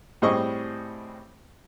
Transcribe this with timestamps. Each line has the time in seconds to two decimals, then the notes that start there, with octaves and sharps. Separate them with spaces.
0.22 A2 G3 C4 G#4 D#5 C#6